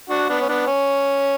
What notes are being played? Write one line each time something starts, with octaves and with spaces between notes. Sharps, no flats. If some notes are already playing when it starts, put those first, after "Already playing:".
D4 F#4
B3 D4
C#4
B3 D4
C#4